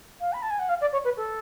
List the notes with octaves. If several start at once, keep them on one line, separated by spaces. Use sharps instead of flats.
F5
B5
A5
G#5
F#5
F5
D5
C#5
B4
A4